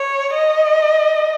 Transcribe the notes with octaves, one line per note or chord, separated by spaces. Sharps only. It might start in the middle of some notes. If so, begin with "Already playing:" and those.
Already playing: C#5
D#5